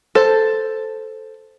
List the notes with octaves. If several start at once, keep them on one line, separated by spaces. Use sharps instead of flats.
A4 C5